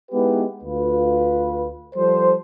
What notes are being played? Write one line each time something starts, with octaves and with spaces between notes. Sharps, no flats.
G#3 B3 D#4 E4 G4 B4
D2 F4 B4
F3 G3 A4 C5